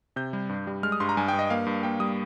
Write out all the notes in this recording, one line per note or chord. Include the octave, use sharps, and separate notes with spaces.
C3 G6
G3
G2
G3
G#3 F6
D#6
G2 C6
A#5
G2 G#5
G2 G5
D#5
A#3 F5
G2
A#3 G5
G3 D#6